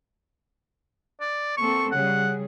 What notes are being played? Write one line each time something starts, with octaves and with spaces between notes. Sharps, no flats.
D5
A#3 C4 A4 C#6
C#3 G3 G#4 F#5